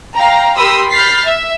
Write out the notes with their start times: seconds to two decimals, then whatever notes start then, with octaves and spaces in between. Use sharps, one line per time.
0.12 F5 G5 A#5
0.56 G4 A#4 B5 C6 D#6 E6
0.90 B5 F6 G6 A6 B6 C7
1.24 E5